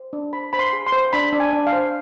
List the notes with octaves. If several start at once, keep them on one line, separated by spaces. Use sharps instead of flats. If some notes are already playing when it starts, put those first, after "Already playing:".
Already playing: C5
D4
C5 B5
C5 B5
C6
G#4
C6
C5
D4 B5
D4
G#5
D4
F5
C5